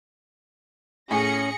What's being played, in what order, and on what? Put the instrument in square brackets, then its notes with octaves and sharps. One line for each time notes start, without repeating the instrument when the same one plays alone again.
[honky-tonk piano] A2 [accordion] C#4 [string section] G#4 A#6 C#7